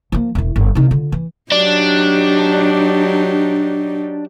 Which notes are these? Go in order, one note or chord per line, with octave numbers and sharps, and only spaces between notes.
F3 A#3
E1 E4
G1
C3 D#3
D3 F4
E3
F#3 D4 D#4 G4